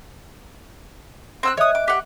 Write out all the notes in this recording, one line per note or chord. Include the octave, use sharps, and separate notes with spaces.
C4 E6 F#6
C#5 D#5 E5 D#6 F#6
D6
G4 F#5